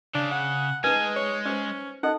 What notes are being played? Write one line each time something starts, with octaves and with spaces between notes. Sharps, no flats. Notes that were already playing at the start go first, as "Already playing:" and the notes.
C#3 D4
F#5
G#3 D#4 B4 G#5
C#5
C#4 C5 C#5
D#4 A4 D#5 F#5